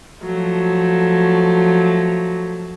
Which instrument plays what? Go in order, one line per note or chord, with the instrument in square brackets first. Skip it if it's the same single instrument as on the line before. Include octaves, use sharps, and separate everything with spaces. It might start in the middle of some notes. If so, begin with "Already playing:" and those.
[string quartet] F3 F#3 A3